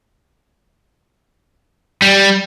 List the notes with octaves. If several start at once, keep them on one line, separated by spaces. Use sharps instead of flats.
G3